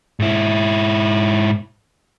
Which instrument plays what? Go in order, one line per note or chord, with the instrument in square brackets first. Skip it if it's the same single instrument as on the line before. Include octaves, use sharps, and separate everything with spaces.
[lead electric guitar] G#2 E4